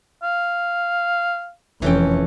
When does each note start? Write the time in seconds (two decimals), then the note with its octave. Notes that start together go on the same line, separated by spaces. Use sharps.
0.23 F5
1.82 F1 E3 C#4 A4 G5